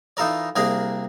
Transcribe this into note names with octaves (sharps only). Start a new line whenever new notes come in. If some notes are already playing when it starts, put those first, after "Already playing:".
E3 D#4 F4 A4 A#4 D5
C2 A#3 D4 G#4 A#4 D5